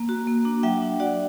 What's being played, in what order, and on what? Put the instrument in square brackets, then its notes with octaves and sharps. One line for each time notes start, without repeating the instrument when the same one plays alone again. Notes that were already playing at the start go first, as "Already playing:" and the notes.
Already playing: [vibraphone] A#3
F#4
A#3
D4
F#3 E5 G5
D4
F#4 D5 F#5